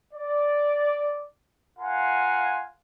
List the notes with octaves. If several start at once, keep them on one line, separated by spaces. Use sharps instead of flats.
D5
F4 A#4 F5 F#5 G#5 C6